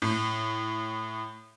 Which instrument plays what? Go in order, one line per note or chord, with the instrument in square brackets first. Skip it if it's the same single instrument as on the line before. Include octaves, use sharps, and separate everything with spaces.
[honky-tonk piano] A2